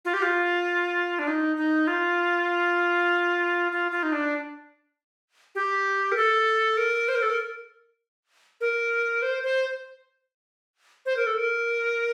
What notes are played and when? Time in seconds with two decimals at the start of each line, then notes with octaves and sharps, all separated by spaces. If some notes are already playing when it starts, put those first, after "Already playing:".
0.05 F4
0.14 G4
0.22 F4
1.19 D4
1.27 D#4
1.57 D#4
1.87 F4
3.72 F4
3.91 F4
4.03 D#4
4.12 D4
5.55 G4
6.12 A#4
6.17 A4
6.77 A#4
7.08 C5
7.15 A#4
7.22 A4
7.29 A#4
8.61 A#4
9.22 C5
9.43 C5
11.06 C5
11.17 A#4
11.27 A4
11.38 A#4